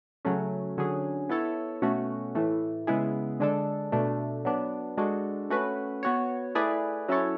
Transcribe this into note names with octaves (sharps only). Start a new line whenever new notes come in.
C#3 F#3 A3 C#4
D3 F#3 C#4 G#4
B3 E4 A4 C#5
B2 A3 C#4 F#4
A2 E3 A3
C#3 G#3 B3 E4 G#4
D3 G#3 D4 A4
B2 A3 D4
F#3 B3 D4
G#3 D4 F#4 A4
A3 C#4 F#4 B4
B3 F#4 C#5
A3 E4 G#4 B4 D5
F#3 C#4 E4 A4 C#5